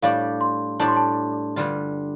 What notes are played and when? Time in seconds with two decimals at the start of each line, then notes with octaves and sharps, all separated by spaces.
0.02 A2 G3 D4 G4 D5 F5
0.41 C6
0.79 A2 G3 D4 G4 D5 A5
0.88 C6
0.97 A5
1.56 G2 D3 G3 F4